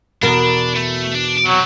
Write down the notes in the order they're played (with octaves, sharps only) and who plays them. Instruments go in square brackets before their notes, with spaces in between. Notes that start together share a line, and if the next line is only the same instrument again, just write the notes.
[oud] E2 B2 A#4 [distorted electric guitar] D4
[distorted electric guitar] A3
D4
[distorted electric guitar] C3 C4 [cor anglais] F#3